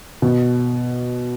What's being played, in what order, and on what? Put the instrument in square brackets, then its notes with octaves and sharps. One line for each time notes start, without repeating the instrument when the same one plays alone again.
[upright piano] B2